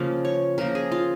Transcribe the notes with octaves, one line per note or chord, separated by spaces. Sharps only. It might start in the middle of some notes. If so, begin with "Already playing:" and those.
Already playing: C#3 F3 A#3 F4
C#5
C#3 F3 A#3 A#4
G#4
F4